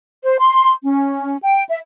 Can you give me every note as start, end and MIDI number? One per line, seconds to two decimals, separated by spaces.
0.24 0.37 72
0.40 0.72 84
0.82 1.36 61
1.42 1.63 79
1.69 1.78 76